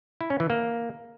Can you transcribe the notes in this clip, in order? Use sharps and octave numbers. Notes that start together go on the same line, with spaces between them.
E4
C#4
E3
A#3